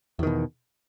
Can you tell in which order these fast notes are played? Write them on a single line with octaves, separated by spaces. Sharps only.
E2 D#3 B2